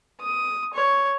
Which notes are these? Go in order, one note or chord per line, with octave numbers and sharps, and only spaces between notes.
D#6
C#5